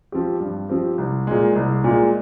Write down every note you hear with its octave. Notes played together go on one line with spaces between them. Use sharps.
F3 C4 G4
G2
F3 C4 G4
C2
A#2 G#3
C2
A#2 G#3